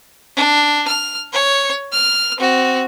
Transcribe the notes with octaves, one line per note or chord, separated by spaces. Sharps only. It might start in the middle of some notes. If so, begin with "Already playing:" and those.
D4
F6
C#5
F6
C4 F#4